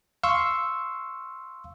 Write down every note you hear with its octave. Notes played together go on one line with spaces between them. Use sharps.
F5 C6 C#6 E6